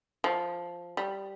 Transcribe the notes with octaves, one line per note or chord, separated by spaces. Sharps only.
F3
G3